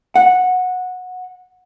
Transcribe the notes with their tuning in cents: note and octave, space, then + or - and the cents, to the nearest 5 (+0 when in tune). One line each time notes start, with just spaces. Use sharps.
F#5 -15